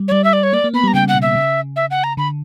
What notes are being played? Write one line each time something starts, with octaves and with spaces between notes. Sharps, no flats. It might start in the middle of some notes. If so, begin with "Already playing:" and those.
Already playing: G3
C#5
G3 D5
E5
D5
C#5
A#3 D5
A#3
B3 B5
G3
A#5
C#3 G5
F#5
B2
E5
C#3
E5
F#5
A#5
D3 B5